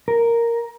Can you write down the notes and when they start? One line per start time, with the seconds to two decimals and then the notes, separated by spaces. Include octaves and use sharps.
0.08 A#4